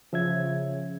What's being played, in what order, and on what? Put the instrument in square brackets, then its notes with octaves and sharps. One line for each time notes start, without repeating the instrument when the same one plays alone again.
[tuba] C#3 [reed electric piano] F3 E5 G#6